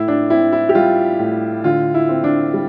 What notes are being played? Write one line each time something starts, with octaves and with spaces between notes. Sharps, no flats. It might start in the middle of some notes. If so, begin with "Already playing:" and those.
Already playing: A2 E4
D4
C4 E4
E4
G4
G3 F4
A2
D3 F4
E4
C4
D4
G3